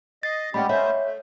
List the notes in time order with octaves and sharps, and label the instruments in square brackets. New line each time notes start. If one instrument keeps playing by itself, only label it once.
[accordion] D#5 [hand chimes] A6 C7
[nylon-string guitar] G#3 D5 F#5 [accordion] C4 C#4 G4 [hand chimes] B5
[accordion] A3 C#4 C5 [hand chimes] C#5 [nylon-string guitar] D#5 E5
[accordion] A3